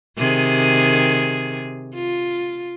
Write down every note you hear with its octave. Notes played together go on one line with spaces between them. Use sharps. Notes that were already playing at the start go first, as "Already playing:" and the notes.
C3 D#3 G#4
F4